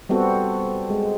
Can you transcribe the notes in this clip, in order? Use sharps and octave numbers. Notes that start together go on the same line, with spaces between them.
G3 B3 C4 F#4 A4
G#3